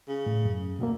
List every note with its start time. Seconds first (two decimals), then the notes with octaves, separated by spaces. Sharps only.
0.08 C#3
0.26 A2
0.45 F#2
0.79 D2 B2 A#3